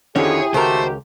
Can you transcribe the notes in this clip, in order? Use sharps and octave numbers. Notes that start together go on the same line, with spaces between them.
F2 D3 D#3 C#4 E4 G4 G#4 C#5
C#2 D#3 A3 F#4 G4 A#4 C5